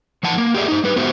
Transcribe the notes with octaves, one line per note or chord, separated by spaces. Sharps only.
E3 F3 F#5 A5
A#3
G4 G#4 B4 D5 E5
D#4 C5
G3 B4
G#3 B3 F#4 G4 C5 E5